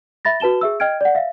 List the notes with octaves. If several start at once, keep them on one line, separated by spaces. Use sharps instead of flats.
E5 B5 A6 A#6
F#4 B4 A5 E7 G7
G#4 E5 E6
D#5 G5 F6 G#6 D7
D5 F#5
E5 F5